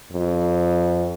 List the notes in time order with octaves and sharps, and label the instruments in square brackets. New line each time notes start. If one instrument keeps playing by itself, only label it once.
[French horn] F2